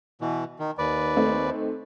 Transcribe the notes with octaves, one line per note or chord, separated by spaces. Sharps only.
B2 E3
D#3
D#2 B4 D5
A3 C4 D#4